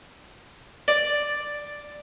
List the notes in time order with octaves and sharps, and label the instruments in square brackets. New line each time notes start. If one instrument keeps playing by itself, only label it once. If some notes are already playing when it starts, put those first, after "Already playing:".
[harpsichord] D5